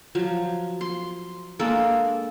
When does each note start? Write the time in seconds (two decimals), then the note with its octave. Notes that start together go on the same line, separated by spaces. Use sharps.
0.15 F3 F#3
0.81 C6
1.59 G#3 A#3 D4 A4